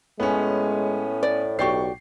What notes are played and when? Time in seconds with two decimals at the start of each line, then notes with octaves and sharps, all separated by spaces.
0.20 A2 G#3 B3 C#4
1.23 D5
1.59 B1 F#4 G4 D5 C#6 C7